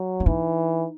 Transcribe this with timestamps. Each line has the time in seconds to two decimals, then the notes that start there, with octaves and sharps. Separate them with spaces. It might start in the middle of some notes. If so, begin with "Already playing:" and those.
Already playing: F#3
0.20 E4
0.26 E3 D#4